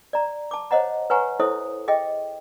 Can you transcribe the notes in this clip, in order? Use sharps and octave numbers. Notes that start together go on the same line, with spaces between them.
D5 A#5
A5 D6
C5 C#5 D#5 F#5 A#5
B4 C#5 F#5 G#5 A#5 C#6
E4 A4 C5 C#5 E5 D#6
G#4 D#5 E5 G5